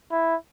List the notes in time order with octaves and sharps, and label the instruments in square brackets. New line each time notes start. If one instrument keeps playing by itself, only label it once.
[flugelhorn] E4